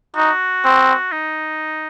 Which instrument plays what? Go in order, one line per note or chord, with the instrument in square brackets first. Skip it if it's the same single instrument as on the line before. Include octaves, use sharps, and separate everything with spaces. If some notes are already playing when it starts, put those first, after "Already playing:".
[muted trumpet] D#4 [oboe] F#4
[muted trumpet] C4
[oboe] D#4